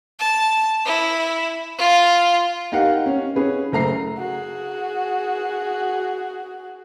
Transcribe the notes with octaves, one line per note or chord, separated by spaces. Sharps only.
A5
E4
F4
D#4 G4 A#4 F5 F#5
C#4
C#4 G#4 B4
F#1 A3 A#5 C7
F#4 G#4